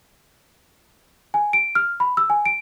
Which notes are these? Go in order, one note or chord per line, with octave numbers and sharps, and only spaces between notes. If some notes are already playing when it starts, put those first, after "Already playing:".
G#5
D7
F6
B5
E6
G#5
D7